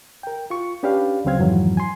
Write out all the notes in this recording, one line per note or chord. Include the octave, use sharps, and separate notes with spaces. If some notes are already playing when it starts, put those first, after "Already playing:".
A#4 G5
F4 C#6
C#4 D4 G4 B4 D5 F5
D2 C#3 F#3 C4 F5 G#6
F2 G#2 D#3 E3 F#3
G#5 C6